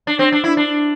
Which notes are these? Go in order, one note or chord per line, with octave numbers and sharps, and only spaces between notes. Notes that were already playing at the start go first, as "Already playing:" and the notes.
D4
C4
D4
E4
D4